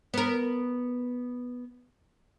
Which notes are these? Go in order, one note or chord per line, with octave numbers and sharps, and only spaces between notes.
B3 A#4